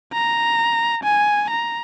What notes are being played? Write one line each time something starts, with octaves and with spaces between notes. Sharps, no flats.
A#5
G#5
A#5